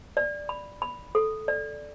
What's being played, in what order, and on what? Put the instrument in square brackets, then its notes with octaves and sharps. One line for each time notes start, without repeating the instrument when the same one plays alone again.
[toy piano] D5
B5
B5
A4
D5